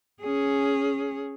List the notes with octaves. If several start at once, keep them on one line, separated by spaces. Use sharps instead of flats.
C#4 G#4